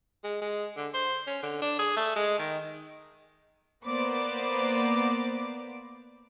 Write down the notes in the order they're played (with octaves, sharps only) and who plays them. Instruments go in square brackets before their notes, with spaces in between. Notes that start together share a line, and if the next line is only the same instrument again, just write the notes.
[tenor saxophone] G#3
G#3
D3
C5
C#4
D3
D4
G#4
A3
G#3
D#3
[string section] A#3 B3 B4 C5 D5 D6